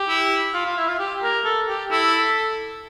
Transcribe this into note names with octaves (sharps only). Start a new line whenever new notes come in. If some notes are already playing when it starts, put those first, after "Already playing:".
Already playing: G4
E4
F4
F4
E4
F4
G4
A#4
A4
G4
E4 A4